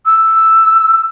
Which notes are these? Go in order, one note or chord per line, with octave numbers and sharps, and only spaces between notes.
E6